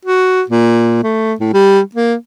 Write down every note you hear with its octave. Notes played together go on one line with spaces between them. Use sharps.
F#4
A#2
A3
A2
G3
A#3